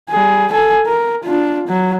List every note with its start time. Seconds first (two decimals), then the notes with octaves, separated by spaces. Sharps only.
0.10 G3 G#4
0.51 A4 G#5
0.86 A#4
1.24 D4 F4
1.68 F#3